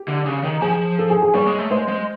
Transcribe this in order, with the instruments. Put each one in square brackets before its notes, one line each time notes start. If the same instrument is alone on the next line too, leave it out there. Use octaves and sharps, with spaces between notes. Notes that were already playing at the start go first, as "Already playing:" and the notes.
Already playing: [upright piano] G4
[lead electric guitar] D3
C#3
D#3
[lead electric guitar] F3 [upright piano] G#4
[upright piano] A4
G#4
G#4
[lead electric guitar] G3 [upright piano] C#5
[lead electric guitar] G#3
A3
[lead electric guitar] G#3 [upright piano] C5
[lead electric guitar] G#3